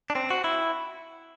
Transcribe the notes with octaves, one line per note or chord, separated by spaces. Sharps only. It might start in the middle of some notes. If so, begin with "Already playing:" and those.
D4
C4
F#4
E4